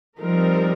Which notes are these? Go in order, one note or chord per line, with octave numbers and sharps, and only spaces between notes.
F3 G3 C4 D#4 A#4